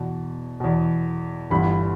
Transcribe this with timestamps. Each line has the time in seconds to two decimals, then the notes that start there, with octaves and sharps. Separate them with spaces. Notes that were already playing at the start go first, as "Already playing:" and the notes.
Already playing: E2 B2
0.60 E2 B2
1.50 G1 G2 E3 B5